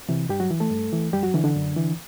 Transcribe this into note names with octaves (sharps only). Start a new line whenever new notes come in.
C3 E3
G2 G3 G4
F#3 F#4
E3
A3 A4
G2
E3
F#2 G3 G4
F#3 F#4
D3 E3 D4
D3 D4
F#2
E3